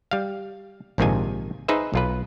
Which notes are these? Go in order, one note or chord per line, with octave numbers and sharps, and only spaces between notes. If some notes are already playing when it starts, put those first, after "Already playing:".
G3 F5
A#1 G#2 C3 D#3 F4 G#5
D#4 G#4 B4 C5 E5
B1 F4 B4